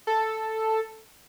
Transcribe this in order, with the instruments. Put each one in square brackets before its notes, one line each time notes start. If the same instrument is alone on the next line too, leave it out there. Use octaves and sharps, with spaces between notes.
[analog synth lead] A4